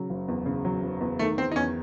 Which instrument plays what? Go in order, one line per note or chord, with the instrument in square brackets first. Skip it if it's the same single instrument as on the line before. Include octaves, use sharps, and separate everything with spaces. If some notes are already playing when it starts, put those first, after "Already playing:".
Already playing: [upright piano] C#3 F#3
F#1
E2
C#3
F#3
F#1
E2
[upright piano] D#3 [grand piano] A3
[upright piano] E2 [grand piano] C4
[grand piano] D#4
[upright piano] E2 [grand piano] C#4